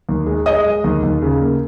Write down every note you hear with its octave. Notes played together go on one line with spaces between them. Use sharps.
D#2
G#3
G#3 D#5 D#6
G#3
D#2
D#2
C#3
A#3